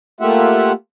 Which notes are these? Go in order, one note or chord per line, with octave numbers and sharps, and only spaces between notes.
A3 A#3 F4 G4 E5 F#5